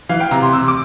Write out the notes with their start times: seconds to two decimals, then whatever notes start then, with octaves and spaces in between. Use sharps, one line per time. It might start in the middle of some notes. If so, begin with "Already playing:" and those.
0.09 E3 F5
0.20 G5
0.31 C3 A#5
0.42 C6
0.53 C3 E6
0.68 D6